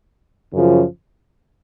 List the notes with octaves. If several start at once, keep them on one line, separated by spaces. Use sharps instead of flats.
F#2 C#3 F3